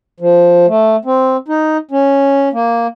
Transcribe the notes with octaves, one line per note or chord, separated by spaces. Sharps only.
F3
A3
C4
D#4
C#4
A#3